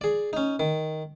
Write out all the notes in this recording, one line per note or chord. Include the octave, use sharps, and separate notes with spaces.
G#4 D5
C#4 D#4
D#3